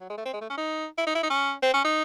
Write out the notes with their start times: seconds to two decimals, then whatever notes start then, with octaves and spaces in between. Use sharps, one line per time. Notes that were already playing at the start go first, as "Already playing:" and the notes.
0.01 F#3
0.10 G#3
0.17 A3
0.25 C4
0.33 G#3
0.41 A3
0.50 C#4
0.57 D#4
0.98 E4
1.06 D#4
1.15 E4
1.23 D#4
1.30 C#4
1.63 C4
1.74 C#4
1.85 D#4